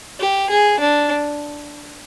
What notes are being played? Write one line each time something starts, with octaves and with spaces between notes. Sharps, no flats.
G4
G#4
D4